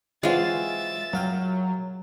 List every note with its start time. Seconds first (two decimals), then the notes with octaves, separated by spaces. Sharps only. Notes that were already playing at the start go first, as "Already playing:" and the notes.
0.23 E3 F#3 G#3 C4 F4 E5 A6
1.13 F#2 F#3 F5 G5